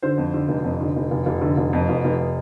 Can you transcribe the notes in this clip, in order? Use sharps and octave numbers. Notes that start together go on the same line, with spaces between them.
D3 C5
F2
D3
F1
F2
D3
F1
F1
F1
D3
F1
F2
F1
F1